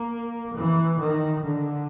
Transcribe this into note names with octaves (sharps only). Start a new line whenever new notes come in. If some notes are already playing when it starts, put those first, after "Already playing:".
Already playing: A#3
E3
D#3
D3